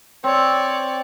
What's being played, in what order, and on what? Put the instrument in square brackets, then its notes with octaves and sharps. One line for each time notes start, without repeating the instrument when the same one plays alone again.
[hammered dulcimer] C4 [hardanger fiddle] C#5 D5